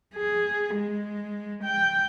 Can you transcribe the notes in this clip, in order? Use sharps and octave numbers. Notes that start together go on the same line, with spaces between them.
G#4
G#3
G5